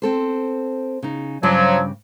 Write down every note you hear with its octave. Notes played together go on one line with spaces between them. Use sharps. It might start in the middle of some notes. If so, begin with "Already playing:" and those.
C4 A4 C5
C#3 D#4
G2 C#3 F3 F#3 D5